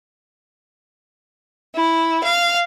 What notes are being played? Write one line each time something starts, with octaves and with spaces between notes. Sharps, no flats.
E4
F5